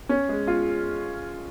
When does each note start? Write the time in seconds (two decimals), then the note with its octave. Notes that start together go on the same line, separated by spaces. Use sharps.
0.09 C#4
0.29 G#3
0.47 F4